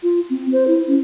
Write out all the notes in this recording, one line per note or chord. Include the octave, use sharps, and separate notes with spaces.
F4
C4
C5
E4
C#4